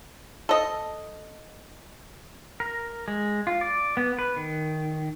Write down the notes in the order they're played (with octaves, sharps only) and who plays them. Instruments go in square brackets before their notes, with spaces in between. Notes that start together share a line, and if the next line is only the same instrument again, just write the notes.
[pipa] A4 D#5
[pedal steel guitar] A#4
G#3
F4
D5
B3
B4
D#3